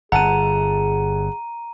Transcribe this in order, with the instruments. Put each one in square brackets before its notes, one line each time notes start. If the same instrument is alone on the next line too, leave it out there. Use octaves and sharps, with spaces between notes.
[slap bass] G1 [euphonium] G#4 [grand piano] F#5 A5 [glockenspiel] A#5 D#7